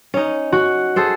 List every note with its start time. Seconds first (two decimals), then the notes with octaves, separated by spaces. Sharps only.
0.14 C#4 D#4
0.52 F#4
0.96 G#4 A4 C5